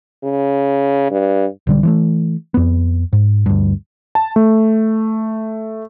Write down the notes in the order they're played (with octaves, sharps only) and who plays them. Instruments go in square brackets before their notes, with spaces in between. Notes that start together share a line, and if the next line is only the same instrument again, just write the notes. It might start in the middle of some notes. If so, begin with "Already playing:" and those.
[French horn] C#3
G2
[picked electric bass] B1 D3 G3
E3 G#3 A3
F2 B3
G#2
D2 G2
[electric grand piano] A5
A3